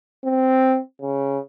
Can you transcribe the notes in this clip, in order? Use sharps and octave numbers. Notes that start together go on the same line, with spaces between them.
C4
C#3